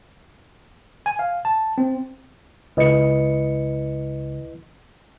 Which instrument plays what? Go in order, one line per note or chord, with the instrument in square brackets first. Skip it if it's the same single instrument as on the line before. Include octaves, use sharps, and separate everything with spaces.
[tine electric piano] G#5
F5
A5
C4
[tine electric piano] C#2 C#7 [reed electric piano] E4 B4 D#5